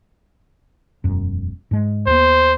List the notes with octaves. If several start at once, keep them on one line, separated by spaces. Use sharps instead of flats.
E1 F#2
G#2 G#3
D#2 B3 C5